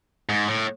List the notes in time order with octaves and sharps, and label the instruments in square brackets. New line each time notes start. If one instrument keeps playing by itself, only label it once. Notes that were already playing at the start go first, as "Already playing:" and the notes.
[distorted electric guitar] G#2
A2